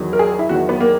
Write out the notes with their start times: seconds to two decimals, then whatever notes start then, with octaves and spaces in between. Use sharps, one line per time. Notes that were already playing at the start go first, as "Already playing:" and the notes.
Already playing: E2 D#3 F#3
0.13 A#4
0.19 G#4
0.39 E4
0.49 E2 D#3 F#3 F#4
0.69 B3
0.80 A#3